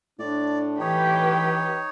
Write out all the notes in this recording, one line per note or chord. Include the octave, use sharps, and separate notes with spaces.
A2 D4 D5
E3 D#4 G4 B4 C#5